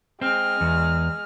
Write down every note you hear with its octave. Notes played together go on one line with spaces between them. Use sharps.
G#3 C4 F6
E2